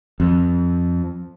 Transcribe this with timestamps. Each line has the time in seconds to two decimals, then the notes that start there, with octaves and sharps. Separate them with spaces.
0.20 F2